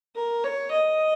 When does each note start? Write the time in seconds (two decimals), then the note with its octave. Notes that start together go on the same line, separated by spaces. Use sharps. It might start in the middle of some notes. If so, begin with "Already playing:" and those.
0.15 A#4
0.44 C#5
0.71 D#5